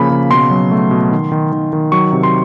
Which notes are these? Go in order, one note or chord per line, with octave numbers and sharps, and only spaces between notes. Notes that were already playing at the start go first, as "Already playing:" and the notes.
Already playing: C#3 F3 A#3 B5
C#3
B2 C6
F#3
A3
B2
D#3
D#3
D#3
D#3
F#3 C#6
C3
C6